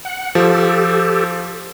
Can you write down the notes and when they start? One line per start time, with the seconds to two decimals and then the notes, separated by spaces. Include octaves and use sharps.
0.05 F#5
0.35 F3 G4 A4